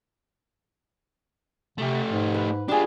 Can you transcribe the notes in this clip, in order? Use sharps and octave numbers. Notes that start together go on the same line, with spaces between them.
C3 A3 G4
G#2
B4
G3 D4 F4 G#4